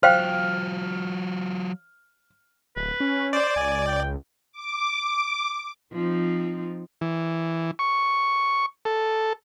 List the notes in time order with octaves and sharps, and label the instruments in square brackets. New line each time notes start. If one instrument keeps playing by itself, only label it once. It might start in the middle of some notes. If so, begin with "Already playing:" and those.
[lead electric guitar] F#3 F4 [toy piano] C5 F5 G5 [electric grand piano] F6
[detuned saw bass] D1 [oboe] B4
[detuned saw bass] C#4
[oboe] C5 [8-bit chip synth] D5
[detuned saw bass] C#2 [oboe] G#5
[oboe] G5
[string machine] D6
[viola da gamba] F3 C4 D#4
[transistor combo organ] E3
C#6
A4